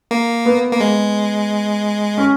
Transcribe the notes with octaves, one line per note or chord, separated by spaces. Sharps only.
A#3
B3
A#3
G#3
C#4